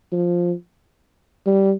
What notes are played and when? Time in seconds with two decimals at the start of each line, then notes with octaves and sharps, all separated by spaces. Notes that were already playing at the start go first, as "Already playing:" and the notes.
0.12 F3
1.46 G3